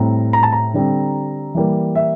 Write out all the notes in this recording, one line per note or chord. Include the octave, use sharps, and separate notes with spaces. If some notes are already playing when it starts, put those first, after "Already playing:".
Already playing: A2 G3 C4 A#5
A#5
A5
A#5
D3 G3 C4
E3 G3 A#3
E5